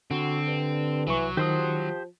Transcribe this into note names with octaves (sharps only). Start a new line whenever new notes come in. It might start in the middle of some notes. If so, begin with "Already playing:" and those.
D3 C4 F#4
G2
C2 E3 F#3 C#6
D#3 F3 G4 C5 D#6